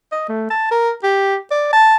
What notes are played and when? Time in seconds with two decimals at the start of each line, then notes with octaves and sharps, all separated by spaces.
0.12 D#5
0.29 A3
0.51 A5
0.71 A#4
1.03 G4
1.51 D5
1.73 A5